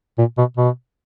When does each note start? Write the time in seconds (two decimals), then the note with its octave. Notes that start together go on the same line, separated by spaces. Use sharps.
0.18 A#2
0.38 B2
0.57 B2